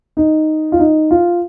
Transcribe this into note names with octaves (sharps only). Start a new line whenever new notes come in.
D#4
F4
D#4
F4